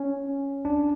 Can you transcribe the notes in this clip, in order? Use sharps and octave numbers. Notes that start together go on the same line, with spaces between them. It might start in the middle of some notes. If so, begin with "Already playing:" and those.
Already playing: C#4
D4